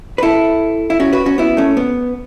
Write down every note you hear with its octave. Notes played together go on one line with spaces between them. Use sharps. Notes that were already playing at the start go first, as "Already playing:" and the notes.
B4
E4 A4
E4
C#4 F#4
F#4 B4
C#4 F#4
B3 E4
A3 C#4
B3